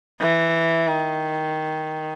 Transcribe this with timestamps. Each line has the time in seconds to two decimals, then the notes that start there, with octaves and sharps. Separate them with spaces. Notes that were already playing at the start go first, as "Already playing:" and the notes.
0.20 E3
0.88 D#3